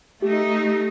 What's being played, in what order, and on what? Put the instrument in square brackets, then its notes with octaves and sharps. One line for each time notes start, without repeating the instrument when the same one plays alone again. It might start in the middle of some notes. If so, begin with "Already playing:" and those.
[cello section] A3 D#4 [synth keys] G4